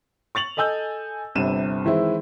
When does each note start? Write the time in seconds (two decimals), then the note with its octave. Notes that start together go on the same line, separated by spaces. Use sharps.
0.35 C#6 A6 F7 F#7
0.57 A4 D#5 G#5 E6 G6
1.35 G1 G2 C3 D#7 E7
1.85 D#3 E3 G#3 C4 E4